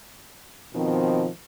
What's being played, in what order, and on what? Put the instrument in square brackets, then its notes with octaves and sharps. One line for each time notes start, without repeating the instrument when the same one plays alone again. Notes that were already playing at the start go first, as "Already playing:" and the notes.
[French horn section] B2 D#3 F3 C4